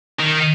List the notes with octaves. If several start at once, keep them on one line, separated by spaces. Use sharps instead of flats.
D#3